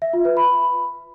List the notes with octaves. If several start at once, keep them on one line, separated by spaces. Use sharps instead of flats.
E5
F4
B4
B5